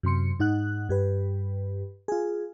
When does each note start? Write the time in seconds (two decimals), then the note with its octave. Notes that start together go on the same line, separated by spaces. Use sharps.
0.03 F#2 C3 C6 C#7
0.40 G#2 D#4 F#5 F#6
0.89 G2 G4 B4
2.08 F4 G#4